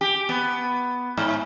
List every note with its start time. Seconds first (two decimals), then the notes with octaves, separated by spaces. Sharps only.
0.01 G4
0.29 B3
1.17 G#2